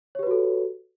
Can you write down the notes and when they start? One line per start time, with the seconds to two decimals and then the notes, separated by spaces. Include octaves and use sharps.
0.15 C#5
0.19 G4
0.23 B4
0.27 F#4
0.31 A4